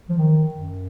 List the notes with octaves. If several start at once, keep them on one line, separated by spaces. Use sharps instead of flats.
F3
D#3
F#2